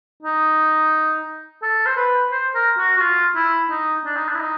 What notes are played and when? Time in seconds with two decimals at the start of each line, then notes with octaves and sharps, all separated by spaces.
0.23 D#4
1.62 A4
1.86 C5
1.96 B4
2.32 C5
2.55 A#4
2.78 F#4
2.98 F#4
3.01 F4
3.36 E4
3.70 D#4
4.05 D4
4.16 D#4
4.28 D4
4.35 E4
4.41 D#4